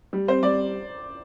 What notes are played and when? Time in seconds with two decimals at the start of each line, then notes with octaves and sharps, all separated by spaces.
0.13 G3
0.28 C4 C5
0.43 G3 D5